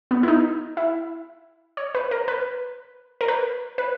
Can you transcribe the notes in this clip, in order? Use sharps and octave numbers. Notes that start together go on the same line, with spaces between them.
B3
E4
D#4
E4
C#5
B4
A#4
B4
A#4
B4
B4